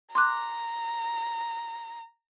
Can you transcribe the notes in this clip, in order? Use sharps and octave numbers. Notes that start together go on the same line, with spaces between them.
A#5 C6 D6 F#6